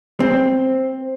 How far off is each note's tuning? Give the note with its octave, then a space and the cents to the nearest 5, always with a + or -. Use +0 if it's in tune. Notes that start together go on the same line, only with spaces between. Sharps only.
C4 +5